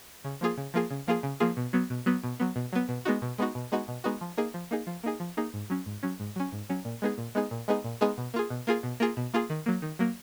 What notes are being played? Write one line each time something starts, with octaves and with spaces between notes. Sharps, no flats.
C#3
F3 A#3 F4 G#4
C#3
F3 A#3 F4 G#4
C#3
F3 A#3 F4 G#4
C#3
F3 A#3 F4 G#4
B2
F#3 B3
B2
F#3 B3
B2
F#3 B3
B2
F#3 B3
B2
G#3 B3 D#4 F#4
B2
G#3 B3 D#4 F#4
B2
G#3 B3 D#4 F#4
B2
G#3 B3 D#4 F#4
F3
A#3 D#4 G#4
F3
A#3 D#4 G#4
F3
A#3 D#4 G#4
F3
A#3 D#4 G#4
G#2
F#3 C#4
G#2
F#3 C#4
G#2
F#3 C#4
G#2
F#3 C#4
A#2
G#3 B3 D#4 G#4
A#2
G#3 B3 D#4 G#4
A#2
G#3 B3 D#4 G#4
A#2
G#3 B3 D#4 G#4
B2
A#3 F4 G#4
B2
A#3 F4 G#4
B2
A#3 F4 G#4
B2
A#3 F4 G#4
D#3
F#3 A#3
D#3
F#3 A#3